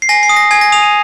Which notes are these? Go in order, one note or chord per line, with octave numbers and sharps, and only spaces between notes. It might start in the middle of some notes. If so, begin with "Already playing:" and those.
C7
G#5 A#6
C7
D#6
A#6
G#5 G#6
A#6
D#6 F7
D#7